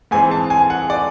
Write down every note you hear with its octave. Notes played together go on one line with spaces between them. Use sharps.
G#2 E3 G#3 C4 G#5
A5
G#5
F#5
D5